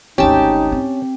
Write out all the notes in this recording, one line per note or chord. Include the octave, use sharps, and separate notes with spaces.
G#1 D2 C#4 D#4 G4 A5
C4